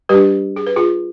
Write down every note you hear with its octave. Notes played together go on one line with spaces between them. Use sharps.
G3 D4 G4 B4
G#4
B4
F4 G#4